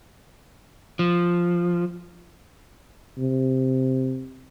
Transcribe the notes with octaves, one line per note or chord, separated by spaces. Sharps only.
F3
C3